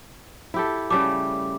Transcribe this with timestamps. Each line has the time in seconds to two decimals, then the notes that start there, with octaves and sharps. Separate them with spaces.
0.54 E4 G4 A4
0.91 C#3 G3 A3 D6